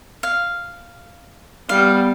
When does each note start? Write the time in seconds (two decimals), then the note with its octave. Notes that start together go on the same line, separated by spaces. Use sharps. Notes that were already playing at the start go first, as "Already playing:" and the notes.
0.23 F5
1.69 G3 B3 F5